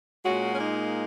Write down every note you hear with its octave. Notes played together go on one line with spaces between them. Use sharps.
A#2 G#3 C#4 F#4
C#4
A#3 D#4